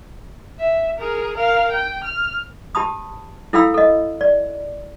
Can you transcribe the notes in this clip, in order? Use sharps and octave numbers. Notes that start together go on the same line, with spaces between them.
E5
G#4 A#4
A#4 F5
G5
F6
G4 A5 B5 D#6
E4 A4 F5 G5 B5 E6
A4 D#5
D5